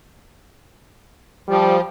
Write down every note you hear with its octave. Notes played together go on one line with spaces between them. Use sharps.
F3 G3